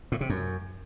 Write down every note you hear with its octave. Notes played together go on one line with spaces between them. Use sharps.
A2
C3
F#2